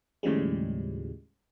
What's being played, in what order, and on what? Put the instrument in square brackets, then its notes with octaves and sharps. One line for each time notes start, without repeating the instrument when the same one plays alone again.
[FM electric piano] D#2 A2 C#3 F3 G3 G#3